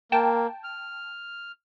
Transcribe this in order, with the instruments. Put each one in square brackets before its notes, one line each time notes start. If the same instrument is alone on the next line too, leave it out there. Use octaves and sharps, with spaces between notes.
[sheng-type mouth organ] A#3 [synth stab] G5 A5
[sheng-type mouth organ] F6